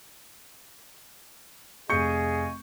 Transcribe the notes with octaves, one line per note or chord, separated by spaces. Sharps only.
F1 G#4 D#5 F5 G#5 C#6 G6 C#7